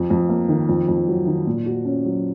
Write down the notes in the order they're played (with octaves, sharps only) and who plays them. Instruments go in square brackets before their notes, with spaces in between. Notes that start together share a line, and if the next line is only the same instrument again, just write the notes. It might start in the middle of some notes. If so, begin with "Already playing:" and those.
Already playing: [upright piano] F2
F2
A#3
D#3
F2
F2
F#3
D#3
A#2
F#4
C#4
F#3